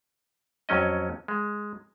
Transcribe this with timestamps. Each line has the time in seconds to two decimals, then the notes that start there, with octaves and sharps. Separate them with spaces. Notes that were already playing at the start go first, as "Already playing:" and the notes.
0.69 F2 F#3 C#4 D#5
1.28 G#3